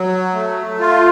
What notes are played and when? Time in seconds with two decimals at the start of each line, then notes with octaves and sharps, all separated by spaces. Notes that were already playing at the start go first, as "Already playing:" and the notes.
Already playing: F#3
0.34 A3
0.80 F4